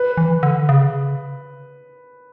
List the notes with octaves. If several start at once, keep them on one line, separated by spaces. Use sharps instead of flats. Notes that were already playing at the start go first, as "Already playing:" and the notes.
Already playing: B4
E3
D3
C#3